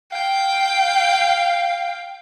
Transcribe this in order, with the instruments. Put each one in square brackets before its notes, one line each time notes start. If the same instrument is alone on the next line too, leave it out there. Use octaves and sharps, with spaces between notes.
[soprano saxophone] F5 [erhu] G5